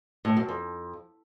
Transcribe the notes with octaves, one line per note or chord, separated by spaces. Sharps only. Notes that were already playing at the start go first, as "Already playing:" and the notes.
A2
F#2
F2